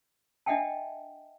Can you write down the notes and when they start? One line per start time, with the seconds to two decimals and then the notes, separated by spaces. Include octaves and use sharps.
0.46 D4 D#5 E5 F#5 G5 A5